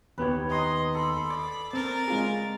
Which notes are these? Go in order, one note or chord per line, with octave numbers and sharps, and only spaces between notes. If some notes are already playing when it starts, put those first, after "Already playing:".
D#2 B3 G4 B4 C#5
D#5 A#5 C6 D#6
A4 B5
D5
C4 A#4 A6
G#3 F4 G#4